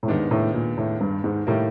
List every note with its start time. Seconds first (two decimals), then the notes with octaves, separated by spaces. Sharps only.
0.03 A2
0.08 D#2 G#2 D#3 G#3 B3 D4
0.31 A2
0.54 A#2
0.77 A2
1.01 G2
1.24 G#2
1.47 A2 D#3 G3 A#3